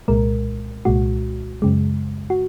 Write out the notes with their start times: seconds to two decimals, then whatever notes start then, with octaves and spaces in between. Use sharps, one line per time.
0.08 C2 A#2 G#3 A#4
0.85 C2 A#2 G#3 F#4
1.62 F#2 C#3 G#3
2.30 F#4